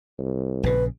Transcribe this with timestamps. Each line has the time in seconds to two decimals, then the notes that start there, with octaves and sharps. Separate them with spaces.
0.18 C2
0.64 A#1 C#3 B4